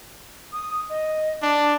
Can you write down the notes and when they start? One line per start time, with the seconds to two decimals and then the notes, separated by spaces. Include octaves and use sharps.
0.52 D#6
0.89 D#5
1.43 D4 A5